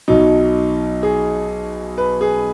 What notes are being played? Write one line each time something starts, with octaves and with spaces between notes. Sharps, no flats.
B1 B2 F#3 D#4
G#4
B4
G#4